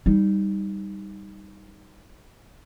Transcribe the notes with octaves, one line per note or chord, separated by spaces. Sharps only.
G3 D#4